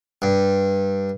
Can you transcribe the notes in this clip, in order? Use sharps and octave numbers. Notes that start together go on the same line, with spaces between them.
G2